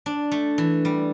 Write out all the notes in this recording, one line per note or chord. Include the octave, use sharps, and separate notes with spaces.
D4
A3
E3
G3